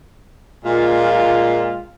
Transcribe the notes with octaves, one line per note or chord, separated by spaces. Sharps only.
A#2 G#3 F4